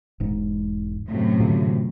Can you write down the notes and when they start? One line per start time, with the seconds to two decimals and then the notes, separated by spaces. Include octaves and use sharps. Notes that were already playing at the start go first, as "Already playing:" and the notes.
0.20 E1 G#2
1.08 F#2 A2 C3
1.40 A#2 D3